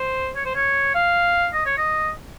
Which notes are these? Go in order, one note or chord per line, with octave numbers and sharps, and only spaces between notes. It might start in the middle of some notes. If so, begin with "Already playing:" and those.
Already playing: C5
C#5
C5
C#5
F5
D#5
C#5
D#5